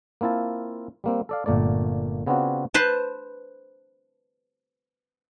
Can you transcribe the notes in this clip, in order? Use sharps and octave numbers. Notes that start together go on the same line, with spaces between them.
A#3 C4 E4 F4 A5
G3 A#3 C4
A4 D5 F5
G1 A#2 A3 A#3 D5
C#3 B3 C4 D4 F4 F#4
B4 C5 A5